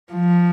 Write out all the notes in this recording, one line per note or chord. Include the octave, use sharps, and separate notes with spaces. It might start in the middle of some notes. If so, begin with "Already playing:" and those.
F3